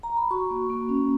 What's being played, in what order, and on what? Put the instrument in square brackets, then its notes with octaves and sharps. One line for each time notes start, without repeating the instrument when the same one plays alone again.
[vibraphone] A#5
B5
F#4 C#6
A#3
A#3
C#4